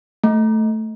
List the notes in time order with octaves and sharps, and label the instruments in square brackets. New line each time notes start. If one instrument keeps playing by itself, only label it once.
[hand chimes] A3